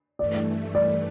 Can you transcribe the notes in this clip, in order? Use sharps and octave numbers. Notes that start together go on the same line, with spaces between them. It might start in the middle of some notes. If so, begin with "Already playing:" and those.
G2 E3 A3 D5
D5